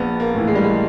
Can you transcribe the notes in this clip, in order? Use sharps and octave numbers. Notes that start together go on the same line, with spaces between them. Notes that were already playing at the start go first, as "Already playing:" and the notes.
Already playing: A#1 B3
A#3
A2 E3
G#3
G3
G#3